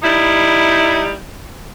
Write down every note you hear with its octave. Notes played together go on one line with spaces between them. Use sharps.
G3 D#4 E4